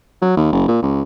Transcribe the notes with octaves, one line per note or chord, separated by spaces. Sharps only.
F#3
D#2
F#1
A#2
C#2